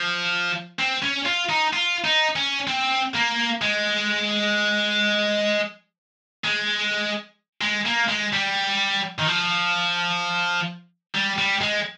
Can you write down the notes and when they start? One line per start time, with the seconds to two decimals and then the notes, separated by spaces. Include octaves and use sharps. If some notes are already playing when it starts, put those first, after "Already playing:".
Already playing: F3
0.79 C4
1.02 C#4
1.26 F4
1.49 D#4
1.73 F4
2.04 D#4
2.36 C#4
2.67 C4
3.14 A#3
3.62 G#3
6.44 G#3
7.61 G#3
7.86 A#3
8.08 G#3
8.33 G3
9.19 D#3
9.27 F3
11.15 G3
11.38 G3
11.61 G#3